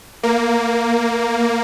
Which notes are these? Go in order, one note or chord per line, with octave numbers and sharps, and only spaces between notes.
A#3